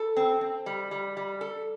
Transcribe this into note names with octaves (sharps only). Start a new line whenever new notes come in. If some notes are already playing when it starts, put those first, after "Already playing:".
Already playing: A4
C4
C4
G3
G3
G3
A4